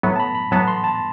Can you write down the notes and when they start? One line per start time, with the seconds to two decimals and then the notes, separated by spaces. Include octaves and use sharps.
0.03 A2 F#3 B3 B5
0.16 A5
0.20 B5
0.35 B5
0.52 A2 F#3 B3 A5
0.68 C6
0.84 A5